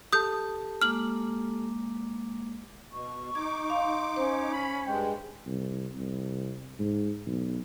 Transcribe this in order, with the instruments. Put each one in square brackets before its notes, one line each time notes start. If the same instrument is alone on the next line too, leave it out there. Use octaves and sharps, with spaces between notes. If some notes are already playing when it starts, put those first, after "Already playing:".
[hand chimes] G4 A4 A5 [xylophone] D#6 G6
[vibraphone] G#3 A#3 D6 [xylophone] F6 F#7
[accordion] B2 [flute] C#6
[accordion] D#4 D6 [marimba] G#6
[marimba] F5 [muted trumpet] C6
[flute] C#4 [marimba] C5
[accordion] B5
[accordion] G2 G#3 [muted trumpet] G5
[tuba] C2
C2
G#2
B1